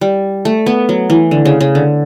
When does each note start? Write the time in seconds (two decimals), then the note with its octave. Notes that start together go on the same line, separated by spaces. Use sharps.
0.01 G3
0.45 A3
0.66 B3
0.89 F#3
1.10 E3
1.31 D3
1.45 C#3
1.60 C#3
1.75 D3